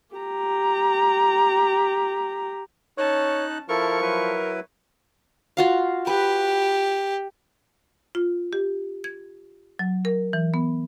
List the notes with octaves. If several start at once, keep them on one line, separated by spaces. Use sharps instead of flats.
G4 A#5
C#4 D#4 C#5 A5 F#6
F3 E4 A4 A#4 C#6
F#3 E4 B4
F4 F#4 F5
G4 B4
F4
G4
G#6
F#3
A#4
E3
B3